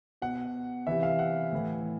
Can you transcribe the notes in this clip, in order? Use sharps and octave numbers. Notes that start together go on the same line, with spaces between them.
B2 F#5
C3 E3 E5
F5
F#5
A2 E3